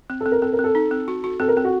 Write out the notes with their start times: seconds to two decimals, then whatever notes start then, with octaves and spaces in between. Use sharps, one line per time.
0.10 C4
0.20 A4
0.26 C4
0.32 A#4
0.42 C4 A4
0.53 A#4
0.59 C4
0.64 A4
0.75 D#4
0.91 C4
1.08 F#4
1.24 F#4
1.40 C4 A4
1.48 A#4
1.56 C4 A4
1.64 F#4